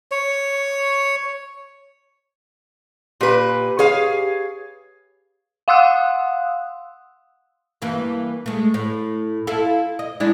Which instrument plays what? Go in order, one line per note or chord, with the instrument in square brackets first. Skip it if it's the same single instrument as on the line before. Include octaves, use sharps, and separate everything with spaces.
[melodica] C#5
[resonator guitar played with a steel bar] A#2 B4 [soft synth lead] G4
[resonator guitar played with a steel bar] G#4 C#5 F5
[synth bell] F5 F#5 C6 D#6 E6 F#6
[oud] G2 E3 A#3
G#3 A3
A2
E4 F4 A4
D#5
G#3 D4 E4